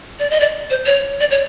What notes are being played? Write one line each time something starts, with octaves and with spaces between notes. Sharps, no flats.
D5
D#5
D5
C5
C#5
D5
C#5